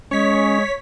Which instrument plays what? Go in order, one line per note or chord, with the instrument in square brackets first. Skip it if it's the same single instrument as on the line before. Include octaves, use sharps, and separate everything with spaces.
[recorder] G#3 [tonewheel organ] C#4 [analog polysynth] C#5 B6